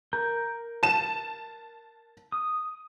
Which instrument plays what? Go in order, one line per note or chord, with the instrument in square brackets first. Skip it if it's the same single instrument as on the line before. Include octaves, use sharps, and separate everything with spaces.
[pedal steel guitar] A#4 A#5 G6
[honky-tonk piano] A5 E7
[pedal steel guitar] D#6